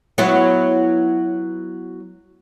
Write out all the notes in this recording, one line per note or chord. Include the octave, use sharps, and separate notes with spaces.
F#3 B3 E4